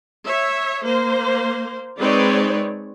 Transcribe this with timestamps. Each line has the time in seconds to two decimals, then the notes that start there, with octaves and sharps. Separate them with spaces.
0.25 C#5 E5
0.85 A#3 C5
1.98 G#3 C4 D#4 B4 C#5 D5